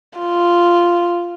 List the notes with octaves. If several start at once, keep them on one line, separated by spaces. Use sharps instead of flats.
F4